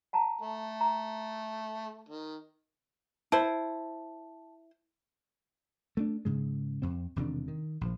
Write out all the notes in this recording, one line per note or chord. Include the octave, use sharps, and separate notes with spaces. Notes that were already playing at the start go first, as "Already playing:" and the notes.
F#5 A5 A#5
A3
A#5
D#3
E4 C5 A5
A3 B3 D4
G#2 C#3 G#3
F2 C4
E1 C3 D#3 D4
D#3
A#1 F3